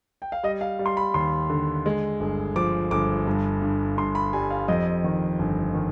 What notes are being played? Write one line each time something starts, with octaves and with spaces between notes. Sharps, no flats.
G5
F5
G3 D#5
F5
G3
C6
B5
D#2 C6
D3
G#3
G1
F3 D6
G1 D6
G2
G2
G2 C6
B5
G3 G#5
F5
F2 D#5
D#3
G1
D#3